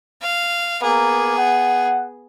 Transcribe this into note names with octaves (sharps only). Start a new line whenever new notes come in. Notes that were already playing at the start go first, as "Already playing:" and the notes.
F5
A#3 B3 G#4
F#5